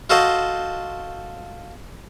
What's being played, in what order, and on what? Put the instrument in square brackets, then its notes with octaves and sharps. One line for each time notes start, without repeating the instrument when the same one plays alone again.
[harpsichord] F4 F#4 A4 C5 D#5